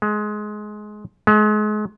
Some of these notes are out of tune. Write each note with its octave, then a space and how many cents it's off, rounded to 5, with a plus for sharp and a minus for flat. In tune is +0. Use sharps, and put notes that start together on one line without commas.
G#3 +20
G#3 +35